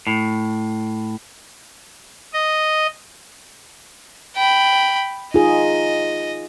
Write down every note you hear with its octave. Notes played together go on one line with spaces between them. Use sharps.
A2
D#5
G5 B5
D#4 F4 G#4 D#5